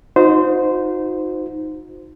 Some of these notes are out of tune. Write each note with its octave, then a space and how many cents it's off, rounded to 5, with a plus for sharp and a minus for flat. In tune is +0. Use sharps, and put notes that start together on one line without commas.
D#4 +10 F#4 -40 C5 -15